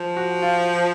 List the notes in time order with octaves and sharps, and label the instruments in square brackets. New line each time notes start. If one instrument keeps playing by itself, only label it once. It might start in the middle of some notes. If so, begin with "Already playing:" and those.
Already playing: [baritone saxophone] F3
[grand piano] F#4
F4